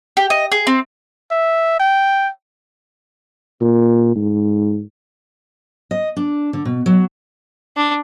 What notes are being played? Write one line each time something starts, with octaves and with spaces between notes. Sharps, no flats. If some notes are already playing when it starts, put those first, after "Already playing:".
G4
D#5
G#4
C4
E5
G5
A#2
G#2
D#5
D4
D3
B2
F#3
D4